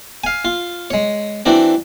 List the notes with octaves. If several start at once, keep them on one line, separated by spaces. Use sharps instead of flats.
F5 G#5
F4
G#3 C#5
E3 C4 D4 F#4 D5